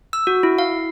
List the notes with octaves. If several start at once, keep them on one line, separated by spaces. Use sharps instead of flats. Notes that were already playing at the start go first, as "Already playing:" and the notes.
E6
F#4
E4
F5